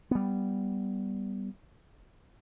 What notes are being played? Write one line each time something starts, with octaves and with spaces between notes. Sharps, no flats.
G3 B3